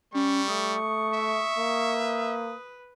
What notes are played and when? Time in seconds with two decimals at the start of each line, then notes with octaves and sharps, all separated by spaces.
0.14 G3 C#4 C#6
0.48 A3 D#6
1.14 E5
1.58 A#3
1.97 B4